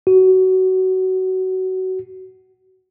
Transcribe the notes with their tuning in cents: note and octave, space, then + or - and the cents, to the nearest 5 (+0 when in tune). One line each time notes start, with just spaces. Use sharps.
F#4 +20